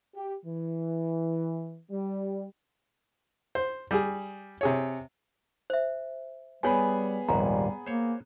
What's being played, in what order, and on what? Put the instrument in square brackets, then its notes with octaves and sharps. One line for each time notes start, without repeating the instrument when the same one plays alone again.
[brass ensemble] G4
E3
G3
[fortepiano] C5
G3 G#4
C3 G#4 C#5
[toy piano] C5 E5
[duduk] G3 [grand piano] B3 G#4 B5 [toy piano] C#5 G#5
[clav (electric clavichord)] A#1 D#2 G#2 [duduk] G3 [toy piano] A#5
[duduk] A#3 [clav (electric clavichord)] C5 C#5